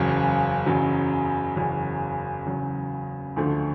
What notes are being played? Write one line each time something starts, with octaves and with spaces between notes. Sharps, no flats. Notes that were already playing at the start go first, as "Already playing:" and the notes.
Already playing: F#1 E2 C#3 F#3
F#1 E2 C#3 F#3
F#1 E2 C#3 F#3
F#1 E2 C#3 F#3
D2 D3 F3 A3